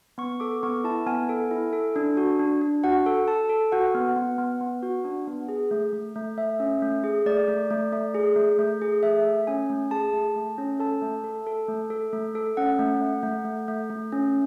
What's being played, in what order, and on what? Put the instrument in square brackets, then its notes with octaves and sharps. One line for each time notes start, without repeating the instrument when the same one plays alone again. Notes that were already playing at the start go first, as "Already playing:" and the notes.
[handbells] B3 C#6
A4 D6
B3 C#6
E4 A5
B3 G#5
A4
E4
A4
D4
F#4
D4
D4
F#4 F#5
A4
A4 A5
A4
F#4 F#5
B3
B3
B3
B3
F#4
D4
B3
G#4
A3
A3
A3
A3 E5
C#4
A3
G#4
A3 D5
A3
A3
A3
G#4
A3
A3
G#4
A3 E5
A3
C#4 G#5
A3
G#4 A5
A3
A3
C#4
A4 A5
A3
A4
A4
A3
A4
A3
A4
C#4 F#5
A3
A3
A3
A3
A3
A3
C#4